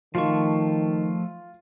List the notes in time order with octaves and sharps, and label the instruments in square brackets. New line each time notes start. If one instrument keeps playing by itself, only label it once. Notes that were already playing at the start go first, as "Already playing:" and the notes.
[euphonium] D#3 [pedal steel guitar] F3 A3 C#6 [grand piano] F4